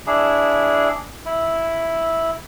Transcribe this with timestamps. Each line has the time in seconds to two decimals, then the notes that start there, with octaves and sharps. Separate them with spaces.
0.07 D4 E4 G#4
1.25 E4